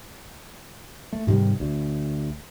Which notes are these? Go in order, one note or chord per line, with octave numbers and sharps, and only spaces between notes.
A3
G#2 C3 D#3 G3
D2